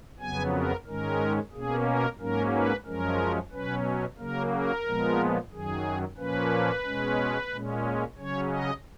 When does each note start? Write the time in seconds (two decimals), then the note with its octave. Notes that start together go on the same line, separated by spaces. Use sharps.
0.20 F2 C#3 F#3 B3 G#5
0.53 A#4
0.86 G#2 D#3 G#3 C#4 A#4
1.53 B2 A#3 C#4 G#4
1.85 A#4
2.19 G#2 F#3 A#3 C#4 A#4
2.53 B4
2.86 F#2 F3 G#3 C#4 A#4
3.52 B2 F#3 C#4 B4
4.18 C#3 F#3 A#3 A#4
4.52 A#4
4.85 A#2 F3 G#3 B3
5.51 F#2 D#3 F#3 G#4
6.17 A#2 F3 A#3 C#4 B4
6.84 B2 G#3 C#4
7.51 A#2 G#3 C#4
8.17 C#3 F#3 C#4 C#5
8.50 D#5